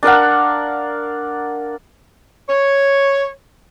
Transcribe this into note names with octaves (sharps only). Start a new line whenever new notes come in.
D4 A#4 F5 F#5
C#5